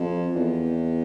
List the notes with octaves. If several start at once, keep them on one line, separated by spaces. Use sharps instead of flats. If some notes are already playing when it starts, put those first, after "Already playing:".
Already playing: F2
E2